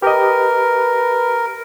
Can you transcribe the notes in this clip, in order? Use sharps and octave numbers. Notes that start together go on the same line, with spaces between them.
G4 A#4 B4 D#5